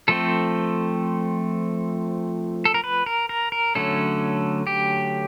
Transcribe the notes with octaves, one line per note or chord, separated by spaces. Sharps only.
F3 A3 C4 A4
A4
A#4
B4
A#4
A#4
A#4
D3 F#3 A3 C#4 A4
G4